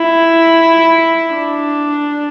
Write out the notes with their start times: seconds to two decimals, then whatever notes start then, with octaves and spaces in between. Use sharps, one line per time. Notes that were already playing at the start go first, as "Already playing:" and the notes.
Already playing: E4
1.34 D4